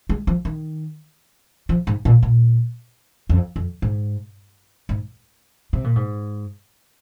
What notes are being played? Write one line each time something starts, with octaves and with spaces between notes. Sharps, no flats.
G#3
F3
D#3
F3
G#2
A#2
A#2
F2
F2
G#2
G#2
C3
A#2
G#2